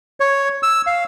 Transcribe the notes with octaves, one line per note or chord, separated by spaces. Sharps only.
C#5
E6
F5